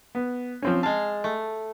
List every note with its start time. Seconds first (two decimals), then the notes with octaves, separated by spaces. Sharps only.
0.15 B3
0.62 F3 C4 C#4
0.83 G#3 F5 A5
1.24 A3